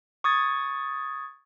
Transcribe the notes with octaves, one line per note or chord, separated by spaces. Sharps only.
C#6 D#6 G#6 A6